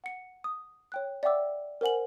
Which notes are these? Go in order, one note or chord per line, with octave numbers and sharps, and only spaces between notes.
F#5 C#7
D#6
C#5 G5 F#6
D5 E5 F#5 G5 D6 E6
A#4 C5 F#5 G#5 F#7